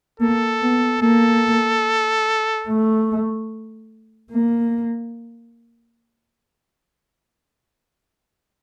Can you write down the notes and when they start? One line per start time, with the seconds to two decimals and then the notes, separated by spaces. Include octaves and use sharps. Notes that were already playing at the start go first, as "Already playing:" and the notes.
0.20 A#3 A4
0.61 B3
1.02 A#3 A4
2.67 A3
4.32 A#3